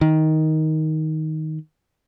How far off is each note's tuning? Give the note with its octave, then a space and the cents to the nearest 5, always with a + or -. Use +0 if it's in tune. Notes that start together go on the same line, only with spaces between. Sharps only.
D#3 +10